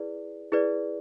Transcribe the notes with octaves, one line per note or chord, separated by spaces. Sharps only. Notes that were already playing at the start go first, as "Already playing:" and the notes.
Already playing: E4 G#4 B4 D5
E4 G#4 B4 D5